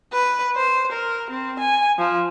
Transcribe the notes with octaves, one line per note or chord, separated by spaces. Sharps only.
B4
C5
A#4
C4
G#5
F3